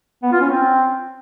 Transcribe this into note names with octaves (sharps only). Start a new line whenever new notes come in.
B3
F4
C#4
C4